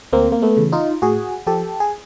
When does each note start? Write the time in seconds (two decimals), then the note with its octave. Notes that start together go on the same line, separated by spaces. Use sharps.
0.13 D2 A#3 C4
0.32 A#3
0.42 A3 B3
0.57 C#3 E3
0.72 D#4 F4
1.02 A2 F#4 G#4
1.47 F3 G4 A4
1.80 G#4